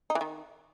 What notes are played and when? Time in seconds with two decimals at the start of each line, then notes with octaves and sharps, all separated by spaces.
0.10 D#4
0.15 E3
0.21 D#3